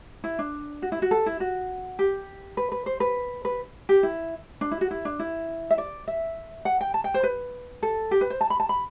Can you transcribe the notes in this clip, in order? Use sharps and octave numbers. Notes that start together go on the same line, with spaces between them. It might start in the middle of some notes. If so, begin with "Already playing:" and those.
E4
D4
F#4
E4
F#4
A4
E4
F#4
G4
B4
B4
C5
B4
B4
G4
E4
D4
E4
F#4
E4
D4
E4
E5
D5
E5
F#5
G5
A5
G5
C5
B4
A4
G4
B4
C5
A5
B5
A5
B5